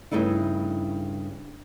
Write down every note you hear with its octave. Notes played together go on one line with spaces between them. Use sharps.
G2 C#3 A3 D#4 E4